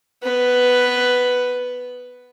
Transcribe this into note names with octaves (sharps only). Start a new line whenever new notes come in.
B3 B4